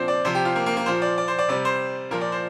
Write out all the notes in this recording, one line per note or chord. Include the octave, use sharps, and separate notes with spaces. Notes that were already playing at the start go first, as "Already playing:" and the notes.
Already playing: A#2 F3 C4 D4 C5
D5
C3 F3 C5
G4
F4
A#3
A#3
A#3
A#2 F3 C5
D5
D5
C5
D5
C3 G3 D5
C5
A#2 F3 A#4
D5
C5